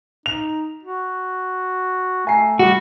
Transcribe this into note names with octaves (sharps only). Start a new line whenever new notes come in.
D#4 F7
F#4
A3 G#5 A#5 C7
G3 F#4 G4